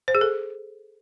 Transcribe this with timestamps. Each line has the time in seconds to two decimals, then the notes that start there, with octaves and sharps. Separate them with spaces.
0.08 C5
0.15 G#4
0.21 A4